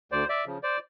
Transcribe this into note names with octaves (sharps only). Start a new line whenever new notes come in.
D2 C5 D5
D5 E5
C#3 F3
C5 D5